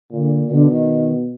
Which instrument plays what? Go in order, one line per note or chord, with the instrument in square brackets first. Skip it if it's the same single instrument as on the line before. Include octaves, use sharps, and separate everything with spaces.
[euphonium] A#2 [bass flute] D3
[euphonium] B2 [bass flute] D3
[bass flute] D#3